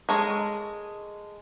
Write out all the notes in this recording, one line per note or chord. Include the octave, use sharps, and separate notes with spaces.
G#3 A4 A#4 C#5 D#5